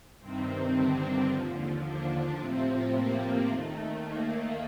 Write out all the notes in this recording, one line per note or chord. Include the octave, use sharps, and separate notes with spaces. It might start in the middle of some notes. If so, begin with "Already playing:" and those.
G2 C3 D#3 C4
D3 D4
D#2 D3 F3
D3 D4
A2 C3 F3 C4
A#3
D#2 D#3 A3
A#3